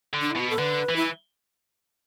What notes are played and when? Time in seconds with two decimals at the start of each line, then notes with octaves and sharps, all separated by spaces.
0.14 D3
0.21 D4
0.31 E4
0.36 B2 F#4
0.50 A4
0.58 D3 B4
0.89 E3
0.96 E4